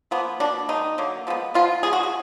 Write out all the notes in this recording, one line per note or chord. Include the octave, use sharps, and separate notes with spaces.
F3 A#3 B3
B2 A#3 D4
D#3 G#3 B3 D#4
D3 F#3 A#3
F3 G#3 B3
F3 B3 F4
B2 G#3 B3 G#4
F#4
G#4